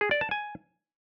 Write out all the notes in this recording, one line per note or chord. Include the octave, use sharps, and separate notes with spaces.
G#4
D5
A5
G#5